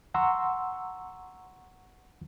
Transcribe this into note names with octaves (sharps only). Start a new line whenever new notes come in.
F#5 A#5 C6 C#6 E6